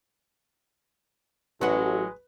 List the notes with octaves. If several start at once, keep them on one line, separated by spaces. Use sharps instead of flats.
A1 F#3 G#3 F#4 B4